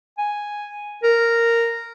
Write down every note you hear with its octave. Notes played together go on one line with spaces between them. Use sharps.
G#5
A#4